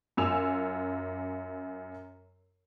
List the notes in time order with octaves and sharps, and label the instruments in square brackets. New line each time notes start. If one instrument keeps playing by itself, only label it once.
[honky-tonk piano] F#2 F4 G#5 E6 F7